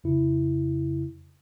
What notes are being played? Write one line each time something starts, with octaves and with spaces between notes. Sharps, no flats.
F2 C#3 E4